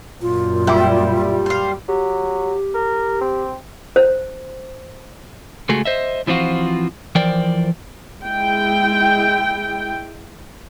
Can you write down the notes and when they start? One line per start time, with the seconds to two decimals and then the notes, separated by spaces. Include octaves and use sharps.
0.22 F#2 A#2 F4
0.67 G3 E4 G5
1.46 C5 F5
1.88 F#3 G4
2.74 A#4
3.21 C4
3.96 C5
5.69 C#2 G#3 A3 F#4 G#4
5.85 C5 D#5 E5
6.27 E3 F3 C4 F4 F#4
7.15 E3 F3 A#4 C5 D5 G5
8.22 G#3 E4 G5